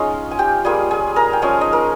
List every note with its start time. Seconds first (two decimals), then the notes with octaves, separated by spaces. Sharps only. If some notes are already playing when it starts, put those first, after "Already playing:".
Already playing: G#3 C#4 D#4 F4 D#5 F5
0.31 G#5
0.39 G4 G5
0.65 G3 A#3 F4 G#4 G#5
0.91 G#4 G#5
1.16 A#4 A#5
1.33 G5
1.42 F3 G#3 C#4 G#4 G#5
1.61 D#4 D#5
1.73 A#4